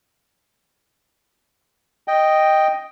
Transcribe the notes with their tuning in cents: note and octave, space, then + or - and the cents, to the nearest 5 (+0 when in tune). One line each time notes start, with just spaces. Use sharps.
D#5 +0 G5 +0